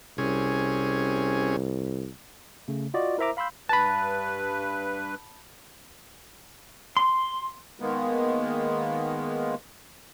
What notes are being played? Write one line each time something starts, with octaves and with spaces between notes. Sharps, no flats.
C2 C3 C#4 G#4
C#3 A3
F4 F#4 D5 D#5
E4 A#4 C5 E5 A#5 D6
F5 B5 C6 E6 G6
G2 B4 A5 B5
C6
D#3 G#3 A#3 B3